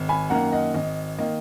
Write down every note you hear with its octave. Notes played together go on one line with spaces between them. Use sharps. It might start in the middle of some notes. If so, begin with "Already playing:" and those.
Already playing: G#1
G#5 B5
F#2 D#3 A#3 F#5 A#5
D#5 F#5
G#1 D#5
D#3 A#3 D#5